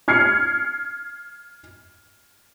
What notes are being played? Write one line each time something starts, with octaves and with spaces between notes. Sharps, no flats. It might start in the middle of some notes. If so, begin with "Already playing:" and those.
F6 G#6 C7 C#7